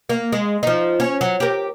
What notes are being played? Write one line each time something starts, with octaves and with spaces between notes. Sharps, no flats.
A#3
G#3
F3 D#4
C#4
F#3
G4 A#4